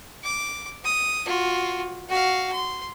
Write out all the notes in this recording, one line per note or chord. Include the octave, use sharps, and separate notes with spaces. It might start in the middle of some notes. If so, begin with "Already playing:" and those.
D6
D#6
F4 F#4
F#4 F5
C6